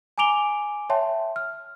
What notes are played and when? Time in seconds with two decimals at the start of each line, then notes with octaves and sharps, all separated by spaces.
0.18 G#5 A#5 D6 D7 F7 G7
0.90 C#5 E5 G5 A5 C6
1.36 F6